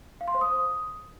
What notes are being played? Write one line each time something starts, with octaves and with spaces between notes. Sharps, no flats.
F5
C6
C5
D#6